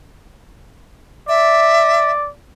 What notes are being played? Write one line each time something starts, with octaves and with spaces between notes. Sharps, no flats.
D5 E5